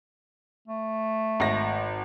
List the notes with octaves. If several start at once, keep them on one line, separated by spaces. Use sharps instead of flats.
A3
G#1 A#6